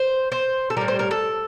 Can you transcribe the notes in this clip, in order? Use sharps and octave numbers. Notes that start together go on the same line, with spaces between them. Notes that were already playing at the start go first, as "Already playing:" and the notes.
Already playing: C5
C5
A4
A2 G3 A#4
C5
A#4
A4